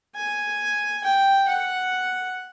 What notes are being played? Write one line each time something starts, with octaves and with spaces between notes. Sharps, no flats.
G#5
G5
F#5